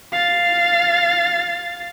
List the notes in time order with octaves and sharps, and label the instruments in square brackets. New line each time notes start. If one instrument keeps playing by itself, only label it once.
[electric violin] F5 A6